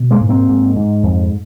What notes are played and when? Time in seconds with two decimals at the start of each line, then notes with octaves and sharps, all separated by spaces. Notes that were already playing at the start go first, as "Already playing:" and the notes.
Already playing: B2
0.11 G#3 A#3
0.20 G#2
0.29 A#3 C4
0.48 G#2
0.76 G#2
1.03 F2